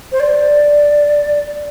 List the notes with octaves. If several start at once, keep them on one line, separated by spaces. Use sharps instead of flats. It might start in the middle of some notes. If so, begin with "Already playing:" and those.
C5
D5